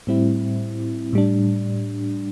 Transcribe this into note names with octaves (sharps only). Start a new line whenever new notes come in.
A2 G3 C4 E4
A2 G3 D4